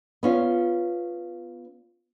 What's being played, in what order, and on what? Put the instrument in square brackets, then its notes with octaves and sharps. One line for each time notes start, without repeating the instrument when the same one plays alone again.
[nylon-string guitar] B3 C#4 F4